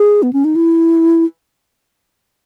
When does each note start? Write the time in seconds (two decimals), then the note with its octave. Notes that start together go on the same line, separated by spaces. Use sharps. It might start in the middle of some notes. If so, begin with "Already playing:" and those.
Already playing: G#4
0.23 B3
0.33 C#4
0.45 D#4
0.56 E4